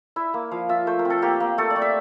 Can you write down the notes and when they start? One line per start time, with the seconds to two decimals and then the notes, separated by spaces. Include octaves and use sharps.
0.16 E4 E5
0.34 A#3
0.51 F3 F5
0.69 F4 E5
0.87 A3 C5
0.99 A#4
1.05 C4
1.10 A4
1.22 A#3 G4
1.40 A#3
1.58 A3 A4
1.70 D5
1.76 A3
1.82 E5